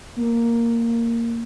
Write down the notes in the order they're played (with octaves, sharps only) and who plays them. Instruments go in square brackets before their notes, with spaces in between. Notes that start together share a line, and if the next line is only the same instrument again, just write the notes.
[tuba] A#3